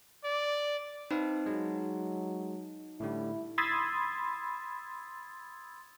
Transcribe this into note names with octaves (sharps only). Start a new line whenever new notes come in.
D5
C4 D#4 B4 F5
F#3 G#3
A2 D3 G3 E4
B5 C6 D#6 E6 G#6 A6